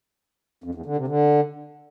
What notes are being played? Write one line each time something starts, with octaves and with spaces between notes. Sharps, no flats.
F2
E2
D3
C3
D3